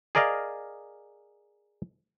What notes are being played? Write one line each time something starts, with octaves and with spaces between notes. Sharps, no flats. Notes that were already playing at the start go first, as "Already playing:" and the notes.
G#4 A#4 D5 D#5 F5